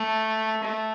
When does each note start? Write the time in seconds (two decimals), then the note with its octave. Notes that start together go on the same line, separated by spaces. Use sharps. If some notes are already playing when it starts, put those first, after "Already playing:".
Already playing: A3
0.64 A3